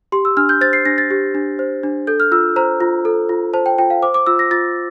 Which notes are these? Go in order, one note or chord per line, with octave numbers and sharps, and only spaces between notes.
G4 C6
E6
D4 F6
G6
C5 A6
C7
D4 A#6
A6
G4
D4
C5
D4
A4 G6
F6
F4 E6
C5 A#5
F4
A4
F4
C5 A5
G5
F4 G5
F5
C5 D6
D6
F4 E6
A#6
F4 A6